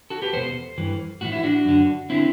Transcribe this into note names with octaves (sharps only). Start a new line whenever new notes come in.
F#4 A4
G4 B4
E2 B2 A4 C5
G2 E3
A2 E3 F#4
E4
D4 F#4
F#2 D3
D3 C4 E4